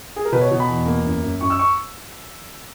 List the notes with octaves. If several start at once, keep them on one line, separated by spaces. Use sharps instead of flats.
G#4
A#4
B2 B4
C#5
B2
B5
E2
A#3
F#2
F#2
F#2 C#6
E6
C#6